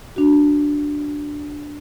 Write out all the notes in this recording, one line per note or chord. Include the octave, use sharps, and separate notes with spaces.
D4 F#4